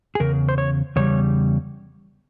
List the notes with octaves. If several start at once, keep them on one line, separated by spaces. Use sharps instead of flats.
G#4
E2 C#3 A#4
C5
C#5
E2 C#3 G3 C#5